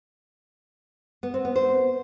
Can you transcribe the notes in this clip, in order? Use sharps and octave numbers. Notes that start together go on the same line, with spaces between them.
B3
C4
B3
C5